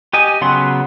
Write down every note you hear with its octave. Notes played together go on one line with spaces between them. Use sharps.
G4 D#5 G#5
C#3 F#3 B3 F#5 C6